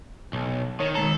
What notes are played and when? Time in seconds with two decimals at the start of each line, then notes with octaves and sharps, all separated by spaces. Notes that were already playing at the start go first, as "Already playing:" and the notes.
0.33 B1
0.80 D#3 C#5
0.95 D#3 G#3 A4 A#5